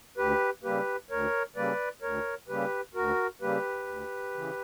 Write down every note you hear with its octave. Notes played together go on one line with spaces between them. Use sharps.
D2 G4 B4
C#3 G3 A#3 G4 B4
D2 A#4 C#5
C#3 G3 A#3 B4 D5
D2 A#4 C#5
C#3 G3 A#3 G4 B4
D2 F#4 A#4
C#3 G3 A#3 G4 B4
D2
C#3 E3